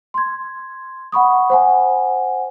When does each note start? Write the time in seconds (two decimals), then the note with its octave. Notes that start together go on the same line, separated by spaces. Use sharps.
0.14 C6 G#6
1.12 F#5 B5 C#6 D#6
1.50 C5 F#5 G#5